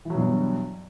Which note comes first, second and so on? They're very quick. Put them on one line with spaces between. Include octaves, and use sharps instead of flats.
E3 F#3 B2 G2